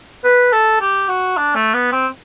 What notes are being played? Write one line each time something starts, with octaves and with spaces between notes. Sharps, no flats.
B4
A4
G4
F#4
D4
A3
B3
C4